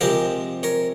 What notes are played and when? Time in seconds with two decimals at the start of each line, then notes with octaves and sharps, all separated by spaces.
0.01 C3 F3 G#3 C4 G4 A#4
0.63 A#4 C#5